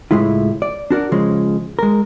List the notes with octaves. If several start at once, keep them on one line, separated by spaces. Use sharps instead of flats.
C#2 A2 G#3 E4 F4
D5
D4 F#4 A#4 D5
C#3 F3 G#3
G#3 A#4